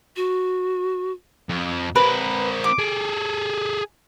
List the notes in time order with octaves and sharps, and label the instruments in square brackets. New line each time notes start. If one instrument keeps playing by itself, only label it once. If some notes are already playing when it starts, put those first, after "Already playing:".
[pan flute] F#4
[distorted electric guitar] F2
[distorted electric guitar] C4 A#4 [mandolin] B4
[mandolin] D6
[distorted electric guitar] G#4 A4